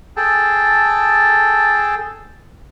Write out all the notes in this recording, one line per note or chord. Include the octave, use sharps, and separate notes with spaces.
G#4 A4 G5 A5